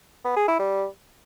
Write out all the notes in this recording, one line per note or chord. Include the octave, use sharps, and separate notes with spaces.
B3
G#4
E4
G3